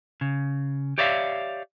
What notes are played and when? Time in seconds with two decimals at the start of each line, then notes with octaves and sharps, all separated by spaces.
0.21 C#3
0.98 G4 C#5 D5 E5 F5